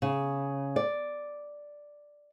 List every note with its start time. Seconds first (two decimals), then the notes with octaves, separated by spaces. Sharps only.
0.02 C#3
0.76 D5